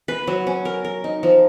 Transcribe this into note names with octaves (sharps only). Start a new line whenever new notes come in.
B4
F#3
C#4
A#4
A#4
D#4
F3